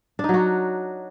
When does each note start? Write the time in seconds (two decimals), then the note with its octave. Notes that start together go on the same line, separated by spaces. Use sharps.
0.19 D4
0.24 D#4
0.29 F#3
0.34 F#4